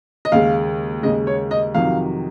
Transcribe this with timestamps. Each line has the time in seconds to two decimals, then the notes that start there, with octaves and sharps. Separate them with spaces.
0.25 D#5
0.32 D#2 C#3 G#3 F5
1.03 D#2 C#3 G#3 D#5
1.27 C#5
1.51 D#5
1.74 F2 C3 D#3 F#3 F5